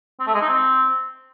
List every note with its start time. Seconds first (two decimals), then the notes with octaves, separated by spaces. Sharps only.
0.20 C4
0.27 A3
0.34 G#3
0.41 D#4
0.49 C4